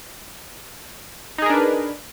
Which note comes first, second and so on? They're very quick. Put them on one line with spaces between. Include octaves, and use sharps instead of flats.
D#4 G#4 A#4 D4 B4